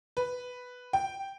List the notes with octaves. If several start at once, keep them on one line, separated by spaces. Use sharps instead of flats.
B4
G5